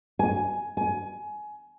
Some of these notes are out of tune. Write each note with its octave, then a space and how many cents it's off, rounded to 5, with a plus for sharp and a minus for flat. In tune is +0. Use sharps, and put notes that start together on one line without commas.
G#5 +10
G#5 +20